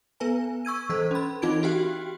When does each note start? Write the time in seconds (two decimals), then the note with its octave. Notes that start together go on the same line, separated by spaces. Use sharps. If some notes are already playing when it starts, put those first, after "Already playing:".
0.20 B3 B4 G#5
0.65 C#6 E6 G#6 D#7
0.89 E3 A4 C5
1.11 C#4 B5
1.42 E3 C4 D#4 F4 G#6 D7
1.63 F#4 G4 G5